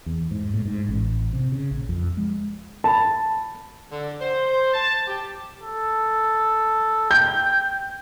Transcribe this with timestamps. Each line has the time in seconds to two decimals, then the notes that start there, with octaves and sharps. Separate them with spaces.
0.06 E2
0.31 G#2
0.54 A2
0.66 G#2
0.89 A1
1.33 C3
1.52 C#3
1.71 A#1
1.89 F2
2.17 G#3
2.84 A5 B5
3.92 D3
4.21 C5
4.74 A5
5.08 G4
5.62 A4
7.11 G5 G6